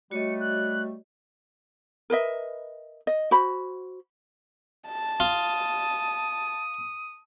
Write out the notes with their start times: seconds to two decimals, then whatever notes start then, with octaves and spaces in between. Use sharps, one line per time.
0.11 G3 A3 F#4 C#5 D#5 C#7
0.40 F#6
2.10 A#4 B4 D#5 E5
3.07 D#5
3.31 F#4 C5 B5
4.88 A5
5.20 F4 D#6